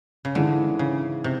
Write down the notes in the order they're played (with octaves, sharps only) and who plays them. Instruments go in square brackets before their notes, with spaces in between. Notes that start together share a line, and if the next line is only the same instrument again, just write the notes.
[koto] C#3
[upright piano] G#2 E3 G#3 [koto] D3
[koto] C#3
C3